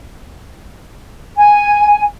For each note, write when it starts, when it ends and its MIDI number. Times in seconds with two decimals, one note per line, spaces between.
1.36 2.04 80